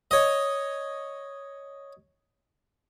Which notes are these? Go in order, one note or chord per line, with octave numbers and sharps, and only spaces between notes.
C#5 D#5